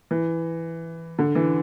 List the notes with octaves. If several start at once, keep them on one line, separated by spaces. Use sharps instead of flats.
E3
D3
E3